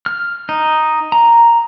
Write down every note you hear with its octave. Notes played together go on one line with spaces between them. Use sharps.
F6
D#4
A#5